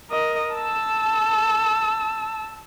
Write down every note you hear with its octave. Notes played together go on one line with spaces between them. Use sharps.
A#4 D#5
A5 E6